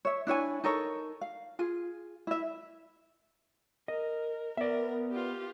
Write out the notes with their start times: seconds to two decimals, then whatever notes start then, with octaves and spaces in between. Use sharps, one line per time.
0.05 C#5 E5
0.27 D4 E4 C#5 G#5
0.64 D#4 A4 A#4 C#5
1.21 F5
1.59 F4 G#4
2.27 E4 E5
3.88 A#4 D#5
4.57 B3 A#4 D5 E5
5.11 F4 G4